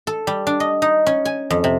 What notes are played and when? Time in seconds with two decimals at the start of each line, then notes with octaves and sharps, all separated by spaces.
0.07 A4
0.27 G3
0.47 D4
0.60 D#5
0.82 D#4
1.07 C#4
1.25 G#5
1.50 F2
1.64 C3